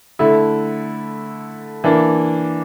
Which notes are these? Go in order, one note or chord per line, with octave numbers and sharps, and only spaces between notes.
D3 A3 E4
E3 A#3 D4